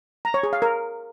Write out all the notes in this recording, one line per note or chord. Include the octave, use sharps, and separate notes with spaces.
A#5
C#5
G#4
F5
A#4